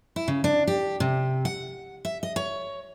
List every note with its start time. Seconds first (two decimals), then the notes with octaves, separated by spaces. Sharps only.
0.16 E4
0.28 C#3
0.44 D4
0.67 G4
1.00 C3
1.45 F#5
2.05 E5
2.23 D#5
2.36 C#5